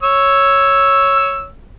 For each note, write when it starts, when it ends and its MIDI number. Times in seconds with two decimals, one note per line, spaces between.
0.03 1.48 73
0.03 1.48 88